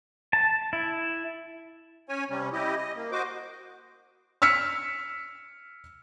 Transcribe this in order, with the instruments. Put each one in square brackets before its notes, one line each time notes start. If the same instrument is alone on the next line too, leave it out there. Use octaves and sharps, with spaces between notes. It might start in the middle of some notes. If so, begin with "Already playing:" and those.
[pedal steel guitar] A5
E4
[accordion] C#4 C#5 G#5
C3 G3 C#4
E4 G4 D#5
D#5
A#3
F#4 C5 D#5 D6
[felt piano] E6 F6 B6 C#7